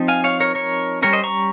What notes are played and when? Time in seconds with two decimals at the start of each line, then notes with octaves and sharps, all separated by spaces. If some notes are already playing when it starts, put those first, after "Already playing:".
Already playing: F3 C4 D#4
0.08 F5 G#5
0.24 C#5 F5
0.40 A#4 C#5
0.55 A#4 C#5
1.02 G3 C#4 A#4 C#5
1.13 C5 D#5
1.24 A#5 C#6